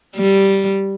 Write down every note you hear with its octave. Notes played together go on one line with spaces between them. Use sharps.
G3